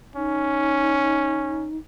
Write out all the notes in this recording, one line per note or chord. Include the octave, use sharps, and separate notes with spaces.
C#4 D#4